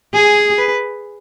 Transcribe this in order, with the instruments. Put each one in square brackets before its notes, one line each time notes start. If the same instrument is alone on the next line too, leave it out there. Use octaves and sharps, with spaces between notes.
[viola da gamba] G#4 [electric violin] G#5
[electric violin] B4